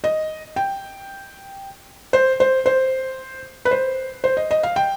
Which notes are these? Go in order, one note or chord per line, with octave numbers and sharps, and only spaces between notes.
D#5
G5
C5
C5
C5
B4
C5
C5
D#5
D#5
F5
G5